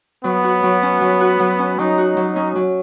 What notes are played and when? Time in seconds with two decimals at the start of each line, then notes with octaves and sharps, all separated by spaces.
0.24 F#3 B3
0.44 F#4
0.63 F#3
0.82 C#4
1.01 F#3
1.21 F#4
1.40 F#3
1.59 C#4
1.79 F#3 D#4
1.98 F#4
2.17 F#3
2.36 C#4
2.55 F#3